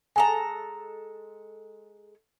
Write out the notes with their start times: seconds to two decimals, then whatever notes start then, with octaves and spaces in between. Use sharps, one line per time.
0.16 G#3 A4 G#5 A#5